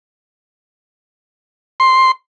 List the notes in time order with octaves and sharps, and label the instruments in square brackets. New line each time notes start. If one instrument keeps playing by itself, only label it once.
[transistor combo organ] C6